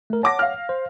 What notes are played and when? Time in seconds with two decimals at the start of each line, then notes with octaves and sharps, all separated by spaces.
0.10 A3 A#4
0.23 C#5 F#5 A5 D6 A#6
0.39 F5 F6
0.69 C5